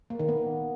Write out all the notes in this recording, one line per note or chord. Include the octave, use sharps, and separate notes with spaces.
A#3
D#3
B3